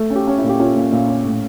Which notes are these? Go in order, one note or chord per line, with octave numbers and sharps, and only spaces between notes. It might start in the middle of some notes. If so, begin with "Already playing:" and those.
Already playing: A3
C#4
G4
C#4
E4
A#2
G4
C#4 F4
A#2
A#2
C#4
A2